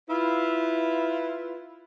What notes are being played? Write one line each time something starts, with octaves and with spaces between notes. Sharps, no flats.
E4 F4 B4